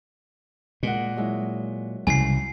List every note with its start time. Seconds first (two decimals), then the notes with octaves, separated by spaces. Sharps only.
0.83 A#2 G#3 F#5
1.16 F#3 G#3 E4
2.07 C2 C#3 E3 G#5 C7